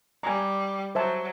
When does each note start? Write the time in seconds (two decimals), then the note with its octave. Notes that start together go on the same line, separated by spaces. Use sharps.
0.23 G3 G#5 A#5
0.95 F#3 C5 E5 A5